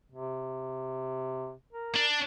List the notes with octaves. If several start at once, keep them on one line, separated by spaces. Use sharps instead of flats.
C3
A#4
D4